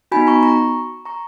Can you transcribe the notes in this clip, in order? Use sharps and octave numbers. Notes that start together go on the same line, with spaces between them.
B3 D#4 F#4 G#5 B5
A#5 C#6
A#5 C#6
A#5 C#6